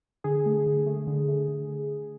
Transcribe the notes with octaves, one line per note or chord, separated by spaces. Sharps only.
D3 G#4
A3
D3
A3
D3
A3
D3